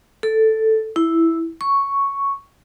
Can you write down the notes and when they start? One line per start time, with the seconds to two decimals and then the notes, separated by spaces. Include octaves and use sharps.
0.23 A4
0.96 E4
1.61 C#6